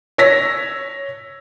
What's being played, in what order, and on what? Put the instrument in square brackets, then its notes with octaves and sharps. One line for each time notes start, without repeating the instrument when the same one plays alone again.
[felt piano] C#5 E6 A#6 B6